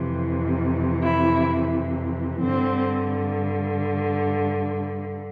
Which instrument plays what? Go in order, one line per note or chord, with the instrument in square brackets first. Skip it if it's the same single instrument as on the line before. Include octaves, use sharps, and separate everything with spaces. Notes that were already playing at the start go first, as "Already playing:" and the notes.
Already playing: [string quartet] F2 C3 E3
E4
G2 D3 C4